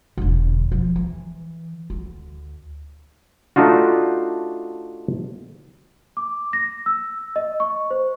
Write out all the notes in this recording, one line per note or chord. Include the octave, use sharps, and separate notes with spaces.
E1 D3
F3
E3
D2
A3 D4 D#4 F4 F#4
D6
A#6
E6
D#5
C#6
C5